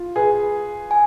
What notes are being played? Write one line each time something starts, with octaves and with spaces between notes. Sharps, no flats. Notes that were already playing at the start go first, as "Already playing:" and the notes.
Already playing: F4
G#4 B4
G#5